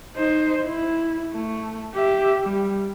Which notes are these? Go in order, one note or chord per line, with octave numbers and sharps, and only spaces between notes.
D#4 C5
E4
A3
G4 E5
G3